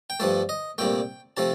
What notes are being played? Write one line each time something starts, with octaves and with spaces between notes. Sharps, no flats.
G5
G2 F3 A3 A5
D#5
C2 A#2 A3 G5
C3 F3 A3 A5